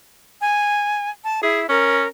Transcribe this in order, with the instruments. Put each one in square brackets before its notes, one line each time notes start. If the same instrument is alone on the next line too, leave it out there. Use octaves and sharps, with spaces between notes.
[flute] G#5
A5
[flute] E4 [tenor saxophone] G#4
[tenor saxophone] C#4 [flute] A#4